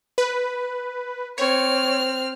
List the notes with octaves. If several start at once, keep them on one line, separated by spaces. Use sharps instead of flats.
B4
C4 C#5 F6